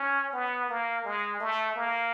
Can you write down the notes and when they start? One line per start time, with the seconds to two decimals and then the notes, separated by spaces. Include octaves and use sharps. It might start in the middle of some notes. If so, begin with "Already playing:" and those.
Already playing: C#4
0.33 B3
0.69 A#3
1.05 G#3
1.40 A3
1.76 A#3